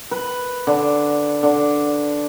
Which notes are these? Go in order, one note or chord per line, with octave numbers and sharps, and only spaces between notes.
B4
D3
D3